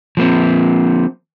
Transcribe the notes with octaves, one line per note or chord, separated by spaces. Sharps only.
F3 A#3 C4